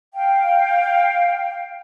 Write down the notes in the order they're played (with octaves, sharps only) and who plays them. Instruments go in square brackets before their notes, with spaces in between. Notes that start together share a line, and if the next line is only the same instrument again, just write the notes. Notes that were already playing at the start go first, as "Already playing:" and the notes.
[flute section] F5 G5